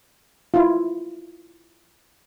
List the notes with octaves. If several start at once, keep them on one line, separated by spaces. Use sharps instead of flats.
E4 F4